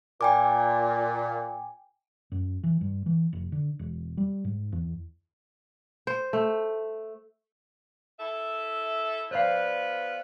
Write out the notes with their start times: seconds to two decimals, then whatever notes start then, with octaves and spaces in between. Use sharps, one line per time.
0.21 A#2 G5 G#5 D6
2.32 F#2
2.64 E3
2.81 G2
3.06 E3
3.33 F1
3.52 D3
3.79 E1
4.17 G3
4.45 G#2
4.72 E2
6.07 C5
6.33 A3
8.19 E4 A4 E5
9.31 B3 F4 B4 C5 D5 F5